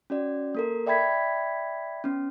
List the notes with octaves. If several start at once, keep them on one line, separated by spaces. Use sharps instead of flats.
C#4 F#4 D5
A#3 A4 A#4
D5 E5 G5 B5 G#6 B6
B3 C#4